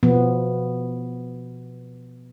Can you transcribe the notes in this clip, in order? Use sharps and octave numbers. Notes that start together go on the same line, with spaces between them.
B2 F3 B3